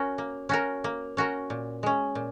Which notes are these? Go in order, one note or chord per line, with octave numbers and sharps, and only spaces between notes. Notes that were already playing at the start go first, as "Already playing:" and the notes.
Already playing: C#4 F#4 A#4
A#3
C#4 F#4 A#4
A#3
C#4 F#4 A#4
A#2
G#3 C#4
A#2